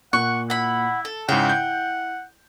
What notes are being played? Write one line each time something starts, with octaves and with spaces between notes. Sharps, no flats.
A#2 F#5 C#6 F#6
E4 F#5 B5
A4
G#2 C#3 E4 F#5 G5
G6